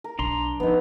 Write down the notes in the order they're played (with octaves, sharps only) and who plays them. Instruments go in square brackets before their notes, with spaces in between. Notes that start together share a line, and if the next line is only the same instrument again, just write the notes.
[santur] A#4
[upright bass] B1 [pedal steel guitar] D4 A#5 C6
[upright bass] F2 [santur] B3 D#4